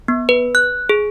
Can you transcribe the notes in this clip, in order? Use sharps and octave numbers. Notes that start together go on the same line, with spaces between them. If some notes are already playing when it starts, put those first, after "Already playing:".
B3
B4
F#6
G#4